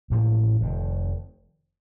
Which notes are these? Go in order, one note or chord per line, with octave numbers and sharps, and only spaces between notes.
A1 A2 F3 A#3
F1 F2 C3 D#3